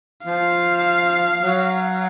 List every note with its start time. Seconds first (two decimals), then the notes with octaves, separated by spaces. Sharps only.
0.25 F3 F5
1.41 F#3